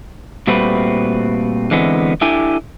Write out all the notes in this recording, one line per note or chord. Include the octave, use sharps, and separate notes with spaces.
A#2 G3 A3 C4 F#4 B4
D3 E3 G#3 B3 C4
D4 E4 G4 A4 G#5